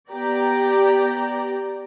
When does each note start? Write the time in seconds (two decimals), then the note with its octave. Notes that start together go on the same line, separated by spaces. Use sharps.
0.11 B3 G4 D5 A#5